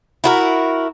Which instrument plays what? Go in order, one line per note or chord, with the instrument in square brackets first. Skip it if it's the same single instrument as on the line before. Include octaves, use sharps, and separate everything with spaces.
[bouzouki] E4 F#4 A#4